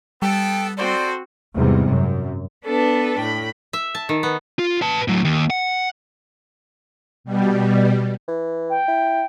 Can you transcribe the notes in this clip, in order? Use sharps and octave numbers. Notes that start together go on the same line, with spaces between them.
G3 B3 A4 G5
C4 F#4 A4 C5 D5
E2 G#2 C3 G3
F#2
B3 D4 A4 B4
A2 G5 B5
E5
A5
D#3
B3
F4
B4 A5
A2 F#3
D#2
F#5
B2 G3
E3
G5
E4